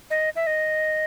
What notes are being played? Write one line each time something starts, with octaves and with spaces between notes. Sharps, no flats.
D#5
E5
D#5